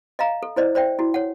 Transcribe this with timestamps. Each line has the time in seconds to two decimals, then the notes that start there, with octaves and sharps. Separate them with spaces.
0.19 D#5 F5 A#5
0.43 A4
0.56 E4 C5 D5 D#5
0.75 C5 D5 E5 G5
0.99 E4 F#4
1.14 C#5 F#5